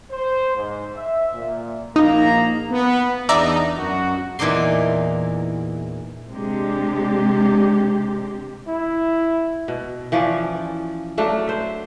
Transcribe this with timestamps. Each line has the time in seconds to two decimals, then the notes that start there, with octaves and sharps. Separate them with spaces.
0.12 C5
0.56 G#2
0.96 E5
1.33 A#2
1.96 A#1 A#3 D#4 A#5
2.71 B3
3.29 E2 D4 D#4 D5 E5 A#5
3.77 F#2 F#4
4.39 E2 A#2 E3 D#4 D5 C6
6.31 C3 G#3 D4 G4
8.68 E4
9.68 B2
10.12 E3 F3 C#4 D5
11.18 F#3 A3 D4 F5
11.47 C5 E5